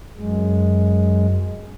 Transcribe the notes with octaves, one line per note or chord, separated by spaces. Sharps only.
F#2 G#3